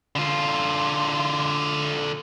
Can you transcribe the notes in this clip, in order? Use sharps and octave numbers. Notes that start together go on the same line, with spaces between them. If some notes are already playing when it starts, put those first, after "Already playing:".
D3 F4